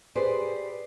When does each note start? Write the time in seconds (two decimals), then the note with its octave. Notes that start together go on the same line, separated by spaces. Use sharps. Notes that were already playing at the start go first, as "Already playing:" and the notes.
0.15 G4 G#4 B4 C5 D5